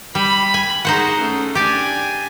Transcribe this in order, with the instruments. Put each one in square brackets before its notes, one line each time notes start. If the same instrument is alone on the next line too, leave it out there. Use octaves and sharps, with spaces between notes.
[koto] G3 [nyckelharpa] B5
[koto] G#5
[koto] D#4 C5 F#5 [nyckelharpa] F#4 G#4
[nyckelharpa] A3 C#4
[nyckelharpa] D4 G#5 [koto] G4 D5